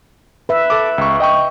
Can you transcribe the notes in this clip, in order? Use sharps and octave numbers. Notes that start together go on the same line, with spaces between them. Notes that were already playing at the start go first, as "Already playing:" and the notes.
B4 E5
A4 D6
C#2 C#6
D#5 G5 C#6